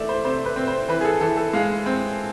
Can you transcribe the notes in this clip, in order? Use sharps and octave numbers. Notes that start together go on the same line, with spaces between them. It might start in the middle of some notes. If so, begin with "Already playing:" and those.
Already playing: E3 A3 D5 E5
C5
C3 C5
B4
C4
C5
E3 B4
G#4
A4
E3 A4
A4
G#3 F5
C4